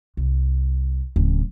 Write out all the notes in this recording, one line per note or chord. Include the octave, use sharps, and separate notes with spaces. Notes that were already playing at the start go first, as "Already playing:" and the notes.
C2
D1 C#3